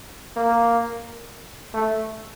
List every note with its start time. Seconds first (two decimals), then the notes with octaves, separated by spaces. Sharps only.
0.36 A#3
1.74 A3